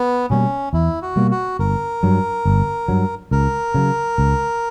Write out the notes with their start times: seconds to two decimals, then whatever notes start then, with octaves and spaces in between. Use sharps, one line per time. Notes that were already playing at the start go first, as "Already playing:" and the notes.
Already playing: B3
0.30 B2 G3 A#3 C#4
0.73 E2 E4
1.02 F#4
1.16 B2 G3 A#3
1.31 F#4
1.59 G1 A#4
2.03 G2 F#3
2.46 G1
2.88 G2 F#3
3.31 C#2 A#4
3.74 C#3 F#3
4.18 C#2